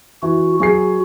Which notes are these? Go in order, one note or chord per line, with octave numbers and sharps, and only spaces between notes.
E3 F#4
F#3 F#4 G#4 C7